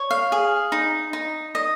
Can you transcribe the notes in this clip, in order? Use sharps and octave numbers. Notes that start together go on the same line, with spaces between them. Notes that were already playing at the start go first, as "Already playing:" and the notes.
Already playing: C#5
F5
G#4
D#4
D#4
D#5